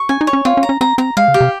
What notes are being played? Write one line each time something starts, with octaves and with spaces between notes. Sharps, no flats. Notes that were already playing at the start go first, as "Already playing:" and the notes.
Already playing: C#6
C#4 G#5
D#4
C#5
C#4
C4 F4
C#4
A#5
C#4
C4 A#5
C4 A#5
G#3 F5
C#3
G4
C3